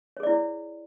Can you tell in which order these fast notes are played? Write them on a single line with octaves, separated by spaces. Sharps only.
C#5 G#4 D5 E4